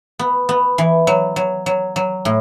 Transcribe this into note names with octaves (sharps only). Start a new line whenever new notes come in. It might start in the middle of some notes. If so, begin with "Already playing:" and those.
B3
B3
E3
F#3
F#3
F#3
F#3
A2